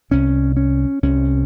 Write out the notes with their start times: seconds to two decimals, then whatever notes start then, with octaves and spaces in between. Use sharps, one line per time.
0.11 C2 C3 C#4
0.57 C#4
1.03 C2 C3 C#4